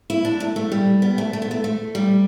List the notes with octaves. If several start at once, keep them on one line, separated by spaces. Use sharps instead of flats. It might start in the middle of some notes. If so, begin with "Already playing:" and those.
E4
D4
A3
A3
G3
B3
A3
A3
B3
A3
A3
G3